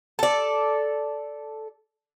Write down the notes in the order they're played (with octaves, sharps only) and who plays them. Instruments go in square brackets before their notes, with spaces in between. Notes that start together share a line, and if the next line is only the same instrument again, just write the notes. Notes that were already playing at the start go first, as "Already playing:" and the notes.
[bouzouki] A4 D5